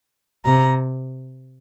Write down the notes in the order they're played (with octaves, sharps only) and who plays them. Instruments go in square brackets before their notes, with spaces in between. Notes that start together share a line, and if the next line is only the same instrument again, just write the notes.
[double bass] C3 [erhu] A#5